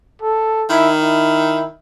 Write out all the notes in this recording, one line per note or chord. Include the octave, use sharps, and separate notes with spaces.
A4
D#3 E4
E4